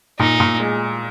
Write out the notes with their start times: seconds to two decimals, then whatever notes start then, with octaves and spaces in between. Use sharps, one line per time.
0.19 A#2 D#4
0.40 A#2
0.60 G#3